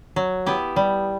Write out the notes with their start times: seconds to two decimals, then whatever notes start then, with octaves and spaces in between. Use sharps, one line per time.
0.16 F#3
0.46 B3 E4 G4
0.76 G3